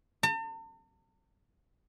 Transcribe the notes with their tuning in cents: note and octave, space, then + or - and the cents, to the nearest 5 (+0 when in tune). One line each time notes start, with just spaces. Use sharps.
A5 +45